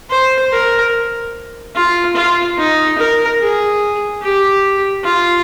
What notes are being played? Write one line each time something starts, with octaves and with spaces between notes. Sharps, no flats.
C5
A#4
F4
F4
D#4
A#4
G#4
G4
F4